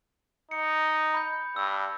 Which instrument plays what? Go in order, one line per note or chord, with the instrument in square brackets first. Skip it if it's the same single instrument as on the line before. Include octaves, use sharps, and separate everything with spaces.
[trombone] D#4 [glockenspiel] C#7
[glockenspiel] B5 G6
[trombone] G2 [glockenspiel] E6